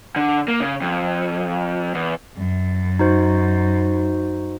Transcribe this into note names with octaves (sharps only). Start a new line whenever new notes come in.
D3
A#3
C#3
F2
E2
F#2
D#4 F#4 C5